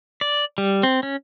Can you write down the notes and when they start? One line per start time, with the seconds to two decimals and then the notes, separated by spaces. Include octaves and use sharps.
0.21 D5
0.58 G3
0.83 C4
1.03 C#4